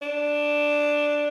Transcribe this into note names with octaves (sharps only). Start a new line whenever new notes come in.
D4